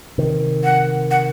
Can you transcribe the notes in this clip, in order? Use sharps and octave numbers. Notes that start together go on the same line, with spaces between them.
C3 D#3
F#5
F#5